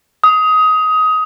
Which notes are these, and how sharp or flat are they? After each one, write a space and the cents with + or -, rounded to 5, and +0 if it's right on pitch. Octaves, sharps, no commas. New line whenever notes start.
D#6 +20